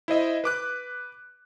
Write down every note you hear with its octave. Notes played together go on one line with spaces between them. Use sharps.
E4 C5 D#5 E5
B4 D6 F#6